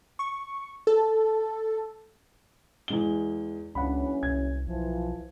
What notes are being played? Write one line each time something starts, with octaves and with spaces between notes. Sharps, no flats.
C#6
A4
E2 G#3 G7
F#1 C#2 E3 C#4 D4 F#5 B5
C2 G#6
B1 E3 F3